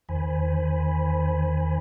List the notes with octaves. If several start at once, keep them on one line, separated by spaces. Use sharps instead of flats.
E2 D#3 C5 G#5 B5